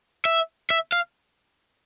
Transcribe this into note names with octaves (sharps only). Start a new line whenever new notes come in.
E5
E5
F5